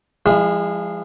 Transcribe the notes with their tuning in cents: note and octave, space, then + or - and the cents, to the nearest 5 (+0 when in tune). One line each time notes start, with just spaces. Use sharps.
F3 -10 G#3 -30 E4 +20